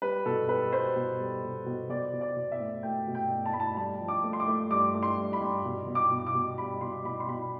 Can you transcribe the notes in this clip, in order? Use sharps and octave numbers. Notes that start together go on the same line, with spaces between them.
G3 B4
B2 A4
G3 B4
G3 C5
B2
G3
B2
B2
B2 D5
B2
D5
B2
E5
A3
A3 G5
B2
G5
A3
A5
A3 B5
A5
G2 A5
F3
D6
A3
C6
D6
A3
G2 D6
A3
C6
G2
B5
G2
B2
B2
D6
B2
D6
B2
G3 B5
B2 C6
B2 B5
C6
B2 B5